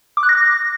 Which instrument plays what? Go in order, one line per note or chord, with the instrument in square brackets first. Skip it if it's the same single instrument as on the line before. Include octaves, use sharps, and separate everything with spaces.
[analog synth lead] D6
F#6
A#6